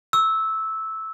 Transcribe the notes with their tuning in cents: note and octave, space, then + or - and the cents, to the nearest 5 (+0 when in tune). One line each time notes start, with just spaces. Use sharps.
C#6 +0 E6 -10